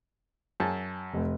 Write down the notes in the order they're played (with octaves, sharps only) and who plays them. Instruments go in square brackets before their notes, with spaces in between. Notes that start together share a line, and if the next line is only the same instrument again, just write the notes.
[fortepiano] F#2 G#4 A5
[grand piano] F1